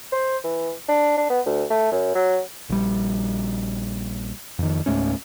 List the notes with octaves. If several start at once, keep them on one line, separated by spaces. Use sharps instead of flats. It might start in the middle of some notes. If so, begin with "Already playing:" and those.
C5
E3
D4
D4
B3
D2
A3
F#2
F#3
A#1 G3
F2 D#3
C#2 G#2 A3 C#4